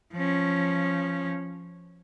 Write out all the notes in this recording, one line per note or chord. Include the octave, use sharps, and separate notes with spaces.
F3 C#4